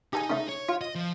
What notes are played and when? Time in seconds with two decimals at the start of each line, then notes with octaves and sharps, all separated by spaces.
0.13 D#4 G4 A4 G#5
0.30 C#3 A3
0.49 C#5
0.69 F4
0.81 D#5
0.95 F3